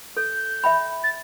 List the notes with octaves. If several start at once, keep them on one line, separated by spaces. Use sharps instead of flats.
A4 G6
E5 G5 B5
A6